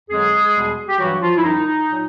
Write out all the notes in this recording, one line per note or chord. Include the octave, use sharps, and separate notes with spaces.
F2 D3 F#3 G#3 G#4
E2 B2 G3
G4
G2 E3 F#3 G3 F#4
F3 F4
E4
F#2 D#3 G3 D#4
A#2 F#3